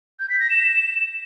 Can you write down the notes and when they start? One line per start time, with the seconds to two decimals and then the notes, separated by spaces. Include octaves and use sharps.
0.20 G6
0.30 B6
0.40 A#6
0.50 E7